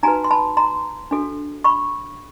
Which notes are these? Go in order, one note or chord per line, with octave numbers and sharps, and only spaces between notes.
D#4 F#4 B4 G#5 A#5
C6
A5 B5
A#5 C6
D4 F#4 A4
B5 C#6